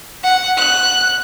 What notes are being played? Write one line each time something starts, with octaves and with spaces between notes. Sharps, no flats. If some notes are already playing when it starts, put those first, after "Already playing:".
F#5
F#6